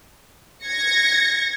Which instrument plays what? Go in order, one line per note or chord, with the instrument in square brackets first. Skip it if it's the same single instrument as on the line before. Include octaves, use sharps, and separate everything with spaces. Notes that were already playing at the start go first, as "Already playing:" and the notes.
[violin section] G#6 A#6 C#7